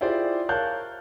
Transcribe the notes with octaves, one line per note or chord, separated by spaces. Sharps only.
E4 F4 G4 G#4 C5 D5
A#4 C#5 F5 A5 F#6 G6